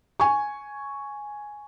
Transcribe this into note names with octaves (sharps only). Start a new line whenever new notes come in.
G#5 C#6